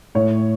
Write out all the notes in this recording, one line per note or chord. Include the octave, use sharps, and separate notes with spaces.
A2 C#5